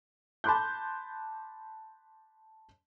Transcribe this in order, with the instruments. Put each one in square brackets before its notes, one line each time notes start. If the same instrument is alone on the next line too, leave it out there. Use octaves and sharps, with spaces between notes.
[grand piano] A5 B5 C6 D6 F#6 G6